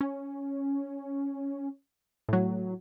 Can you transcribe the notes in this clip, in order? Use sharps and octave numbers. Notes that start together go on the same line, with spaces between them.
C#4
A2 F#3